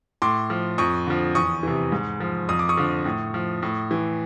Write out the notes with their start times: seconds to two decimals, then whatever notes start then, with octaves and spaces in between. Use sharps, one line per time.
0.22 A2 C6 D6
0.50 F3
0.78 F2 C#6 D#6
1.07 D3 F3
1.35 E2 C#6 D#6
1.63 C3 E3
1.92 G#2
2.20 F3
2.49 F2 D#6
2.59 D6
2.69 C#6 D#6
2.77 D3 F3
3.05 A2
3.34 F3
3.62 A2
3.91 E3